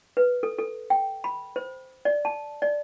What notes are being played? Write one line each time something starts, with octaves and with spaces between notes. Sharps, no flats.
B4
A4
A4
G5
B5
C5
D5
A5
D5